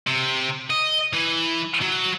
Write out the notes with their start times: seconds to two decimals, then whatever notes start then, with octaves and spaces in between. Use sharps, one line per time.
0.07 C3
0.70 D#5
1.13 E3
1.82 F#3